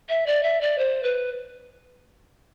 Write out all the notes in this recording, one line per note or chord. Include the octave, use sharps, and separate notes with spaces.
E5
D5
E5
D5
C5
B4